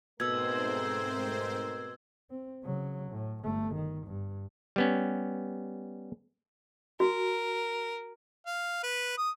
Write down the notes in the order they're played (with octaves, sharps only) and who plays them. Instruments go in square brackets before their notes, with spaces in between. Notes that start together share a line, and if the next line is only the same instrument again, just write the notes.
[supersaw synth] G#2 C4 C5 [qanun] B2 [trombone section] A3 A#4 [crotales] E6 G#6
[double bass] C4
C#3 F#3
A2
G1 A3
D#3
G2
[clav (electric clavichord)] G3 B3 C#4
[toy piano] F#4 [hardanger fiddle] A#4
[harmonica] F5
B4
D#6